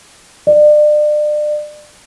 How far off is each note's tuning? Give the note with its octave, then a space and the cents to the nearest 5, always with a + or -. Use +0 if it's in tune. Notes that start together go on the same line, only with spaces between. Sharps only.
D5 +35